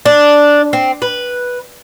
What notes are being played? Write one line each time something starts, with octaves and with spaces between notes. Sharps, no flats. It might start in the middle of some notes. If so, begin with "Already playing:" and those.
D4
C4
B4